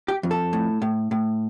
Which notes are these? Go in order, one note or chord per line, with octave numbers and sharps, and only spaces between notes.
G4
F2
A4
A2
A2
A2